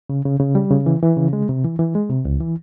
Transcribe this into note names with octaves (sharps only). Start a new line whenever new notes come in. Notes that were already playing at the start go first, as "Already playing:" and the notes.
C#3
C#3
C#3
G3
C#3
E3
E3
C#3
G#3
C3
E3
E3
G#3
C3
C#2
E3